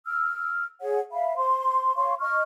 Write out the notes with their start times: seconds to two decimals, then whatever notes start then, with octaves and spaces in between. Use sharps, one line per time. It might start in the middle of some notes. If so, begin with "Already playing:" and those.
0.07 E6 F6
0.80 G#4 C#5 F#5
1.12 E5 F5 B5
1.37 C5 C6
1.96 C#5 F5 C6 C#6
2.20 D#5 C#6 F6